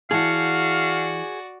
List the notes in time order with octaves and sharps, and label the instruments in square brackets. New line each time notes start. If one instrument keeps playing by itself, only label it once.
[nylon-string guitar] E3 A5 [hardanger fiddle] F#4 D5 [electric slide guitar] G#4 F#5 [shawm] F5